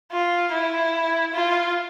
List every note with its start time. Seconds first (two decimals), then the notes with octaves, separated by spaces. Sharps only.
0.12 F4
0.52 E4
1.34 F4